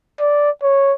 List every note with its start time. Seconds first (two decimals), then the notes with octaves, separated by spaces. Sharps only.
0.20 D5
0.62 C#5